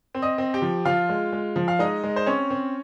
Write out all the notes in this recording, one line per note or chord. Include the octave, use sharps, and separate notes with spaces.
C4
D#5 D#6
C4
G4 G5
F3
F3 F4 F5
G#3
G#3
F3
F5
G#3 D#4 D#5
G#3
C5
C4 C#4 C#5
C4